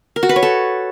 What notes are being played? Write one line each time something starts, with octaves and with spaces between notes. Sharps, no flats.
A#4
F#4
B4
C#5
A4